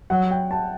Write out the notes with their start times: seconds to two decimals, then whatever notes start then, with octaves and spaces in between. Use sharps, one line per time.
0.10 F#3 F#5
0.31 G5
0.51 A5